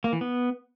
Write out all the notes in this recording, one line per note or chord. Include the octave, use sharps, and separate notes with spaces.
A#3
E3
B3